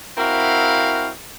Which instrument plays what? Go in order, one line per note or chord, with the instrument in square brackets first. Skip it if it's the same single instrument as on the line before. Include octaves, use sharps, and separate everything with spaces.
[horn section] C4 E4 F#4 A#4 F5